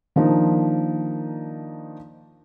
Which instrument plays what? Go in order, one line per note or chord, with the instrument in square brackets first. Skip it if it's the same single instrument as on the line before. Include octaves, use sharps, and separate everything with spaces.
[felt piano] D#3 F3 A#3 D4 D#4